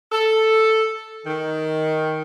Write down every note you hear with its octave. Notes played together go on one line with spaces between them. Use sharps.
A4
D#3